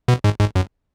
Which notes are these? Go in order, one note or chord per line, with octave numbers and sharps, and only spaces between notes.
B2
G#2
G#2
F#2